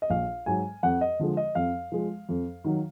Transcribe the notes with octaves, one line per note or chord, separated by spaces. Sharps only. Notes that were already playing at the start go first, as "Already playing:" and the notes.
D#5
A#1 F5
G#2 F#3 G#5
F2 F#5
D#5
D3 F3 G#3
D#5
F2 F5
F3 G#3
F2
D#3 F#3